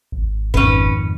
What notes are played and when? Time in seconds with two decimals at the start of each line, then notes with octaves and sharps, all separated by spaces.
0.12 G#1
0.54 F2 G#2 D#3 C#4 B4